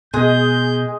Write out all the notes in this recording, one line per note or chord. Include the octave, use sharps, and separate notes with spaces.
B2 G#3 G#4 D#5 G6